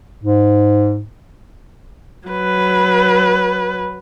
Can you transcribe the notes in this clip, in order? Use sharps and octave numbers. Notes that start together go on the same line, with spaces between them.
G#2
F#3 B4